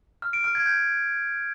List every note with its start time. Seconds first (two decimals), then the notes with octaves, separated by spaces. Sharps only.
0.22 F6
0.33 D7
0.44 F6
0.55 G#6
0.66 G6